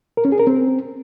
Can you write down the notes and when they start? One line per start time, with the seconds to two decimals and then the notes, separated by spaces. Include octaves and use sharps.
0.17 A#4
0.25 C#4
0.32 G#4
0.40 A#4
0.47 C4